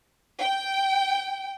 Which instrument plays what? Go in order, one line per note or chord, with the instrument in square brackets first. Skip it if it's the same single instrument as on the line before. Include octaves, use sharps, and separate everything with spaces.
[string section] G5